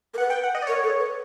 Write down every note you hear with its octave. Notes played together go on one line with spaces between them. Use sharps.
A#4
B4 F#5
G5
F#5
D#5
D5
A#4 C#5
A4
B4